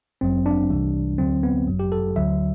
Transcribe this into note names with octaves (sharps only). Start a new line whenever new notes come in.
G1 F#2 F#3 C4
D4
C2 C3 E3 G3
D2 D3 F#3 C4
B3
G1 F#2 F#3
G4
A4
D2 D3 F#3 E5